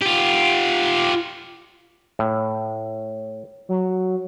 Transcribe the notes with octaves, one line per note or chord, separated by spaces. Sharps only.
F4 G4
A2
F#3